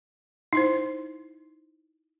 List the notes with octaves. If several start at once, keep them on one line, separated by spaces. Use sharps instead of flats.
D#4 E4 C5